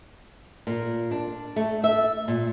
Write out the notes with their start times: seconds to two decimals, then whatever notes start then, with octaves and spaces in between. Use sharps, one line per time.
0.67 A#2
1.11 D4
1.56 A3
1.84 E5
2.28 A#2